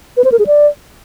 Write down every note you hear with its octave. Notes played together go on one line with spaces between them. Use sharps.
B4
C5
A#4
G#4
D5